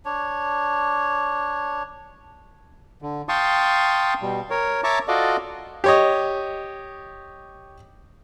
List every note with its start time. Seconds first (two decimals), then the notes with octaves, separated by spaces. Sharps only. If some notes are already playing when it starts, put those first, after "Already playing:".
0.05 D4 C#5
3.02 D3
3.29 F5 G5 A5 C6 C#6 D#6
4.22 B2 G3
4.50 A#4 C#5
4.84 C#5 E5 A5 A#5 C#6 D6
5.08 F4 F#4 A4 D5 D#5
5.84 G4 C#5 D#5